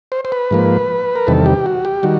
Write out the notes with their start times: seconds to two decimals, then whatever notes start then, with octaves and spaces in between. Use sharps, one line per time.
0.12 C5
0.25 C5
0.32 B4
0.51 G#2 F3 A#3
1.16 A#4
1.27 E2 C3 D#3 G3 A4
1.46 G4
1.66 F#4
1.85 G4
2.03 D#3 G3 F#4